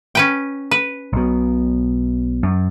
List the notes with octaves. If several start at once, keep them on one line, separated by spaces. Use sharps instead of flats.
C#4 B4 G5
B4
B1 B2
F#2